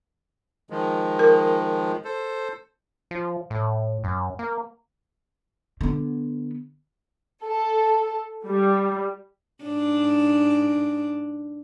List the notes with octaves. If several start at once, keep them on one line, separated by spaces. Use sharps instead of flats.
D#3 F3 G#3
A#4
A4 C5
F3
A2
F#2
A#3
D3 B3
A4
G3
G#2 D4